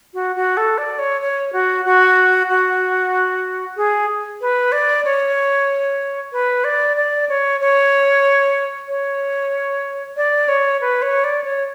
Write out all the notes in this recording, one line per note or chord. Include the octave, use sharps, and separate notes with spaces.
F#4
F#4
A4
D5
C#5
C#5
F#4
F#4
F#4
G#4
B4
D5
C#5
B4
D5
D5
C#5
C#5
C#5
D5
C#5
B4
C#5
D5
C#5